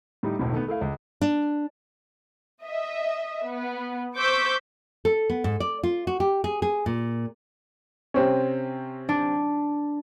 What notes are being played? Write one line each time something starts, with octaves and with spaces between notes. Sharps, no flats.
A2 G3 D#4
E1 B1 A2
D#3 A3 B3
A3 E4 F5
C#2
D4
D#5 E5
B3
C5 C#6 D6 E6 G6 B6
A4
B3
G#2
D5
F4
F#4
G4
G#4
G#4
A#2
C3 C4 C#4
D4